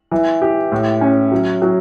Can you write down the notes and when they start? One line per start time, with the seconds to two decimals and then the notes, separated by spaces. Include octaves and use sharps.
0.11 E3
0.42 G4
0.72 A2
1.01 C#4
1.32 F#3
1.62 F#3